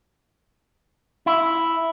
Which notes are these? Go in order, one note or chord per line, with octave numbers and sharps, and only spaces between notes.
E4